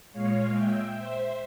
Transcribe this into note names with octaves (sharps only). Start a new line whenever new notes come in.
A#2 G#3 C#5 F5
E5 G5
C5 E5